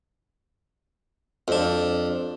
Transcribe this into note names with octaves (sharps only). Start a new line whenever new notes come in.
F2 D4